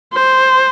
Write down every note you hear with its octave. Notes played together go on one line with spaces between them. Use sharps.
C5